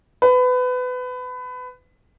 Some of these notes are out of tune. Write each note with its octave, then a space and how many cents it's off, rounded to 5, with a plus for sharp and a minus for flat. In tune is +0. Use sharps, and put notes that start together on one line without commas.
B4 +25